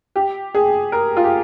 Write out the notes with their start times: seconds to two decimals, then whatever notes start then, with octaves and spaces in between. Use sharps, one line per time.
0.16 G4
0.55 G#4
0.92 A#4
1.17 F4
1.24 G4